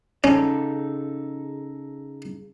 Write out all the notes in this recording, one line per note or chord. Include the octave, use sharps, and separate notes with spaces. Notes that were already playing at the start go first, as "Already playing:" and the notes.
C#3 C#4 D#4 A4